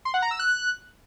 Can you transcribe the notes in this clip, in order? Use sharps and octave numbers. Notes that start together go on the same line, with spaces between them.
C6
F#5
A#5
E6
F#6